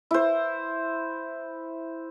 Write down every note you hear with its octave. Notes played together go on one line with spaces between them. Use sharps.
E4 C5